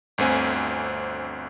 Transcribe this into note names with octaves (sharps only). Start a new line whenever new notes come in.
G1 D2 C4 G#5